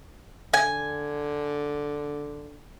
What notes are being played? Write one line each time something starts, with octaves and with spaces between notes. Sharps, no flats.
D3 G#5